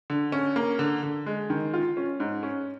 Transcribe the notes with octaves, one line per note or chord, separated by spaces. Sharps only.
D3
C#4
A#3
D3
D3
G#3
D#3
F4
C#4
G#2
C#4